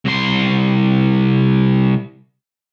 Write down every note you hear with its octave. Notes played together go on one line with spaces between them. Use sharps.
C2 C6